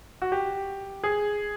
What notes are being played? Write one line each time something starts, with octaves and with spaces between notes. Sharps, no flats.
F#4
G4
G#4